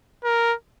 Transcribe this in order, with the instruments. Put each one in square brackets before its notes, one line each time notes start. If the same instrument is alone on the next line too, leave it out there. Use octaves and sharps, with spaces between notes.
[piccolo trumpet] A#4